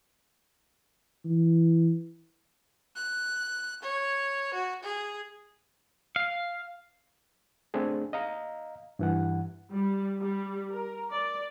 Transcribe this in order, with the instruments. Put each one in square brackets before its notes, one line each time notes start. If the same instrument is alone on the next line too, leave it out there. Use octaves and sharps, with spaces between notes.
[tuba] E3
[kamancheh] F#6
C#5
F#4
G#4
[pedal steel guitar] F5
[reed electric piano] A3 C4 D4 G#4
D#5 F5 A#5
G2 E3 F#5
[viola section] G3
G3
A#4
D5